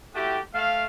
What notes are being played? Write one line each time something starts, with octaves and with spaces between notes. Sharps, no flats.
A3 E4 F#4 G4
A3 F5